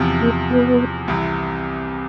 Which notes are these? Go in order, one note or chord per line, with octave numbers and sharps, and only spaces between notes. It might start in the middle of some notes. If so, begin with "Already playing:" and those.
Already playing: E2 C3 F3
A#3 A#4
B3 B4
C2 C3 E3